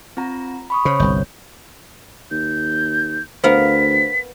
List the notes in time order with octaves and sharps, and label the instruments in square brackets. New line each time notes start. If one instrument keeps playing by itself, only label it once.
[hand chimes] C4 F4 A#5
B5 C#6 D#6
[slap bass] C#3 [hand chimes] C5 C#5
[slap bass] G1 C2 [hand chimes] G6
[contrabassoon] D#2 [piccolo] G6
[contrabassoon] D2 [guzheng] B3 A#4 F5 [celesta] C5 [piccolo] B6